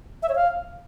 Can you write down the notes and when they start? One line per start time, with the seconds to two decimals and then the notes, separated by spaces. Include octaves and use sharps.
0.23 E5
0.29 C#5
0.35 F5